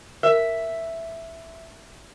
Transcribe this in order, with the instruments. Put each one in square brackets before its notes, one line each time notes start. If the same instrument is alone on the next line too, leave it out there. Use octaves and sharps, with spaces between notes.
[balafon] A#4 [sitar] E5